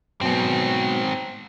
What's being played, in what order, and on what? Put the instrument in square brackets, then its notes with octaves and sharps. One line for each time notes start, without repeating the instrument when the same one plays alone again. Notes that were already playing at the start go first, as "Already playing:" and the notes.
[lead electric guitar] G#2 C4 [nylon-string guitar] B2 F#3 B3